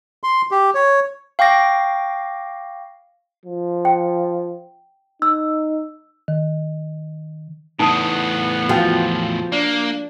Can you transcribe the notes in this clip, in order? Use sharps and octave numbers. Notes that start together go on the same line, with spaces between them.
C6
G4
C#5
F5 G5 C#6 D6 A#6 C7
F3
G5
D#4 E6
D#3
E2 A2 B3 D#4 A5 D#6
F3 F#4 G5
A#3 D4